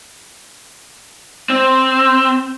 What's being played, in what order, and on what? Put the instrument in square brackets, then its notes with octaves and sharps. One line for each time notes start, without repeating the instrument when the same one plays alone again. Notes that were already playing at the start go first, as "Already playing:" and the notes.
[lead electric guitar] C4